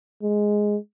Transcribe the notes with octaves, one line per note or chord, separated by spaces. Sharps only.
G#3